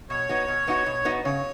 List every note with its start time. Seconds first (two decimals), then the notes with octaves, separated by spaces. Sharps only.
0.09 B2 C#5
0.29 B3 D#4 F#4
0.48 B2
0.67 B3 D#4 F#4
0.86 B2
1.05 B3 D#4 F#4
1.24 C#3 C#5